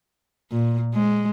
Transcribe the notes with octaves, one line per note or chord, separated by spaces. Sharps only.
A#2
G#3